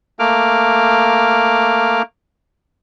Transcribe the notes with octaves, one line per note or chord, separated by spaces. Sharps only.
A3 A#3 D6 F6